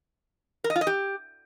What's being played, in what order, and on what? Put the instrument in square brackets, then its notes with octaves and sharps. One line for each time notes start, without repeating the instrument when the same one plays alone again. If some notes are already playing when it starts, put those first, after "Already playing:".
[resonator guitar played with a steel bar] A#4
D#5
F4
D#5
G4